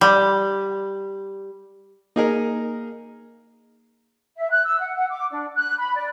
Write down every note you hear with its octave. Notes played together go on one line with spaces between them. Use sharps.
G3
A#3 D#4 G#4 A#4
E5
F#6
E6
F#5
F#5
D6
D4
F#6
B5
D5